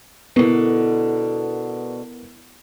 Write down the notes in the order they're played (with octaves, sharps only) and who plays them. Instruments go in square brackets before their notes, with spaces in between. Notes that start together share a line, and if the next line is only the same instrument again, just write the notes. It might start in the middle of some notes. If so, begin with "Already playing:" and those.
[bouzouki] B2 D3 [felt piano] B3 E4 A#4